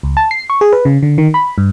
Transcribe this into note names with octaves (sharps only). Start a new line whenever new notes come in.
C#2
A5
C7
C#6
G#4
B4
C#3
D3
D#3
B5
G2